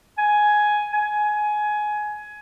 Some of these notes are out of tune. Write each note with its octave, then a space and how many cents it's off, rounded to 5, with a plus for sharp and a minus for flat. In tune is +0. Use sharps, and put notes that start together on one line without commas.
G#5 +10
G#5 +15